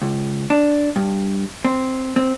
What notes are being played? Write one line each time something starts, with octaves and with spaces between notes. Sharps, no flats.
C#2
D4
G2
C4
C4